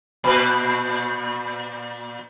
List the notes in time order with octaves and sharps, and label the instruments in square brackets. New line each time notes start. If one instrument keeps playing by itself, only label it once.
[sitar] A#2 B4